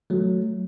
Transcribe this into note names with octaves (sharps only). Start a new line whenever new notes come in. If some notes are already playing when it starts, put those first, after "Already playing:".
F#3 A3